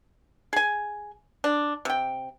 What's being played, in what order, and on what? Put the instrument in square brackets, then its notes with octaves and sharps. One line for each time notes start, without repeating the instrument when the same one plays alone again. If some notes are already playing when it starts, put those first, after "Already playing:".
[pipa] G#4 G#5
D4
C3 G5